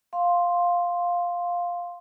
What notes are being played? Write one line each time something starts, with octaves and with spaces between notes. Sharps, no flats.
F5 C6